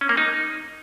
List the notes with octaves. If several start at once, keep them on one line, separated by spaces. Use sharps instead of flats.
C#4
A#3
D#4